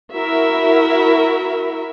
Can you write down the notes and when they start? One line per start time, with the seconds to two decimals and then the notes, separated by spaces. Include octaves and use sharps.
0.14 E4 F#4 A#4 E5